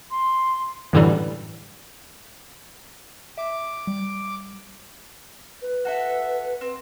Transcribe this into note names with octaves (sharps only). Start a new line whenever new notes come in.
C6
F#2 A2 D3 E3 F#3 G3
E5 D6
G3
B4
F#4 A4 E5
C4